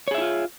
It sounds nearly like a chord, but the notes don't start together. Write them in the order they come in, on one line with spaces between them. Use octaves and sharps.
C#5 G#4 E5 E4 F4